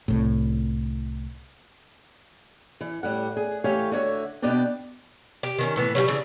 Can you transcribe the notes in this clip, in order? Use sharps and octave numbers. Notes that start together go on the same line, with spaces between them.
C2 A2
E3
A2 G3 F#5
G#4
E3 A3 G4 C#5 F5 G#5
D3 F#4 C#5 E5
B2 B3 D4 D5 G5
G4
D#3 B3 C#4
A2 E3 B3
F#3 G3 A#3 C#4
C#3 E3 D4